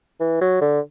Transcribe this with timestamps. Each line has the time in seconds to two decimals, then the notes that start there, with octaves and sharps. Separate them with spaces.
0.20 E3
0.41 F#3
0.61 D3